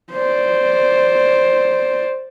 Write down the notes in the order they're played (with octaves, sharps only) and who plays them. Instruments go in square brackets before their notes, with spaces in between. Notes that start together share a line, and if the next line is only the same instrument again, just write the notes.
[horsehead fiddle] C5 D5